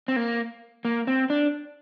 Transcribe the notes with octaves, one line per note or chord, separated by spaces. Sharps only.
C4
A#3
A#3
C4
D4